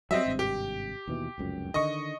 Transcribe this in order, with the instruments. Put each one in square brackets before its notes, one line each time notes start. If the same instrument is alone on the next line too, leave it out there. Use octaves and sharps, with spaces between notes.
[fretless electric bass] F#3 G3 [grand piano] C4 D#5 E5
[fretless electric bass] G#1 G2 C3
[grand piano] G4
[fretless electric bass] D#2 B2 E3
F1 C#2 F#2
[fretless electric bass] D3 D#3 [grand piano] D#5 C#6